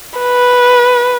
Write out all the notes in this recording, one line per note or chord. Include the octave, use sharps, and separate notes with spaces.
B4